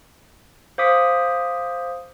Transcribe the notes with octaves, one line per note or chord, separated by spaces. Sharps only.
C5 F5 D6 D#6 B6